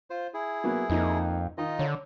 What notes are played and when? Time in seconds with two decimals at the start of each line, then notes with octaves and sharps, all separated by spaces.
0.10 F4 C5
0.34 E4 G#4
0.64 F#3 A#3 B3
0.90 F2 A#3 D#4 D#5
1.58 D#3 D#4 F4 D#5
1.79 D3 C#5